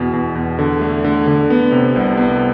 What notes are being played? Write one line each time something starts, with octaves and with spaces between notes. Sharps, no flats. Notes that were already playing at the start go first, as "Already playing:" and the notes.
Already playing: E2 B2
E2
E2
D3
A3
D3
D3
B3
C3
C2
B3